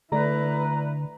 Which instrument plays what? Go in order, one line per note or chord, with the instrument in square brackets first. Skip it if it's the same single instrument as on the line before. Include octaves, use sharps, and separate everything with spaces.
[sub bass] D3 [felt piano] A3 D5 [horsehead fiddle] E4 B4 [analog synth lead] A#5